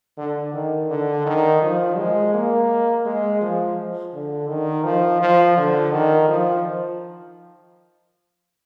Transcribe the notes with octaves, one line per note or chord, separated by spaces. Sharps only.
D3
D#3
D3
D#3
F3
G#3
A#3
G#3
F3
D3
D#3
F3
F3
D3
D#3
F3